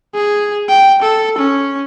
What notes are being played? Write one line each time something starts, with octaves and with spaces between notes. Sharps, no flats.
G#4
G5
A4
C#4